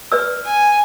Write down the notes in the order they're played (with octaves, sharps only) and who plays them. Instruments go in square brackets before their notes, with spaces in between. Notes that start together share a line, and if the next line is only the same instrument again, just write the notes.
[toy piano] B4 D5 E6
[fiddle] G#5